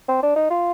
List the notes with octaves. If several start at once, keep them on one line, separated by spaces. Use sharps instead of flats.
C4
D4
D#4
F4